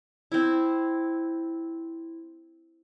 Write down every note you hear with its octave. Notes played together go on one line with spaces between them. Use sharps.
C4 E4